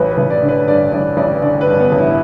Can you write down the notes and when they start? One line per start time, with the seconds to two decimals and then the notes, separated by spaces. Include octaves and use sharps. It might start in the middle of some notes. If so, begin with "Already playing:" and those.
Already playing: A1 B4
0.11 B4
0.18 A1
0.30 D5
0.42 D3
0.49 B4
0.68 G2 D5
0.92 A1 D5
1.17 A1 D5
1.42 D3 D5
1.61 B4
1.67 G2
1.80 B3
1.92 A1
1.98 E4